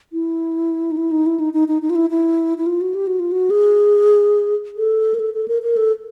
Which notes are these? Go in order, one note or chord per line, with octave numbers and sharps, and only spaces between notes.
E4
D#4
E4
D#4
E4
D#4
D#4
D#4
D#4
F4
E4
E4
E4
F4
F#4
G4
F#4
F4
F#4
G#4
A4
A#4
A4
A4
A#4
A#4
A4